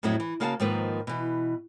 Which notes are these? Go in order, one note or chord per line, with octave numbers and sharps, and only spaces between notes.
F2 A2 F#3 B3 E4
E3
C#3 A#3 F#4 F5 F#5 A5
G#2 D#3 F3 A#3 B4
B2 E3